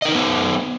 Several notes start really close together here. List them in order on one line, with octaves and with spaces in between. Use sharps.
D#5 A#4 D#4 B4 B3